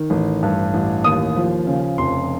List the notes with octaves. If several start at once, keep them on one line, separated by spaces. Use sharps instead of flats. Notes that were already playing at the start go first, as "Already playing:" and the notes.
Already playing: D#3
A1
G2
A1
D#2 D#6
F3
C#3
F1 C6